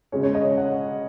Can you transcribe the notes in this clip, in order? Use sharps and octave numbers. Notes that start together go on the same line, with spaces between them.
C#3 G#3 C#4 C#5
C#5
D#5
F#5